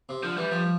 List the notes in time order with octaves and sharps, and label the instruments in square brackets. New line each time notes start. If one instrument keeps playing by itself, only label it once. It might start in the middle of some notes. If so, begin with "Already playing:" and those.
[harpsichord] C3
[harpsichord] D3 [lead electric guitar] F3
[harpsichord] E3 [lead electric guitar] G3
[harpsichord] F3